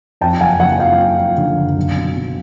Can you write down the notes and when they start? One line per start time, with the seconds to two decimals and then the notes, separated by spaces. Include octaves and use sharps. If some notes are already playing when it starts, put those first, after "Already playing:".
0.21 F2 G5 A5
0.41 F#1 F#5 G#5
0.60 F#1 F#5 G#5
0.79 F3 F5 G5
0.99 F3
1.18 F3
1.38 D3
1.58 F#1
1.76 B1
1.96 B2
2.16 B2